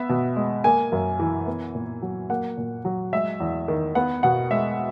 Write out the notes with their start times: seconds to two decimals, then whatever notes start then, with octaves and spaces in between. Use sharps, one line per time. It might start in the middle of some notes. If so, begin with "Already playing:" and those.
Already playing: B3 E5
0.09 B2
0.36 G#3
0.64 A#3 G#5
0.92 F#2
1.20 E3
1.47 B3
1.75 A#2
2.02 F#3
2.30 A#3 F#5
2.57 A#2
2.85 F#3
3.13 G#3 E5
3.40 E2
3.68 D#3
3.95 B3 F#5
4.23 B2 F#5
4.51 G#3 E5